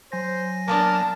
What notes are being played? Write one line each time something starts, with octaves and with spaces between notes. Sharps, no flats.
F#3 C5 G#5 A#6
A#3 B3 D4 A#4 A5